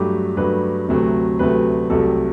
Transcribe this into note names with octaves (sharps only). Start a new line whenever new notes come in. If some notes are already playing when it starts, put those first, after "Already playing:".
Already playing: G2 F#3 A3 G4
G2 F#3 A3 B4
D2 C3 F#3 A3
D2 C3 F#3 A3 B4
C2 C3 F#3 A3 A4